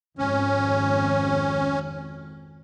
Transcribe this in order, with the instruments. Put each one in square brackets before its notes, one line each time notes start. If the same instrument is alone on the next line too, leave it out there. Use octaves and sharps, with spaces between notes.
[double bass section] G#1 F2 [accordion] C#4